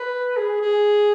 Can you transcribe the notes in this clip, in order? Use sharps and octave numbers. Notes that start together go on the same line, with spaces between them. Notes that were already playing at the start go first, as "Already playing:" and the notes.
Already playing: B4
G#4
G#4